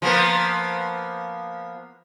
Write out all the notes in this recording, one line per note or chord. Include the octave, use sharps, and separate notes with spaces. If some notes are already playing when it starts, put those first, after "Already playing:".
F3 A#3 B3